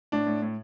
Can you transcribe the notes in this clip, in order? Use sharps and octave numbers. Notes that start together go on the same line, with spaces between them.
A2 D4
A2
A2